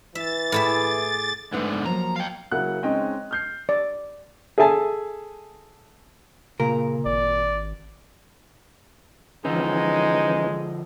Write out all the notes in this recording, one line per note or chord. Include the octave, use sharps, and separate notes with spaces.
E3 E5 A6
A2 E4 G#4 E5 D6
G#2 D3 A3 B4 F#5
B3
F3 F#3 A#3 A#5
F5 G5
C#3 F#3 A#3 E4 F#5 F#6
G#3 C4 C#4 D#4 D#5 G5
F6 G6 C7
D5
G#4 A4 E5 G#5 A5
A#2 C#3 A#4
G#1 D5
D3 E3 F3 G#3 C#4 D#4